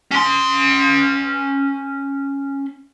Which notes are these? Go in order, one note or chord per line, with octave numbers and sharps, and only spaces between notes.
C#4 C6